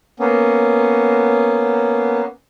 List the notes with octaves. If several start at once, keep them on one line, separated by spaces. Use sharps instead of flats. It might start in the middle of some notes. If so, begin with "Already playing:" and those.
A#3 B3 C#4